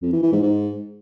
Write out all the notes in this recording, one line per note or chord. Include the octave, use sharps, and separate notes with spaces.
F2
E3
E3
G#2
G#2